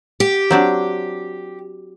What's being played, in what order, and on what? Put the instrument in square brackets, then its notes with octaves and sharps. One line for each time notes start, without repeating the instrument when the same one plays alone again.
[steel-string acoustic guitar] G4
[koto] F#3 C4 D4